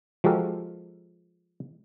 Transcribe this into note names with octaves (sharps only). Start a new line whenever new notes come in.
F3 G#3 F#4 G4 A4 A#4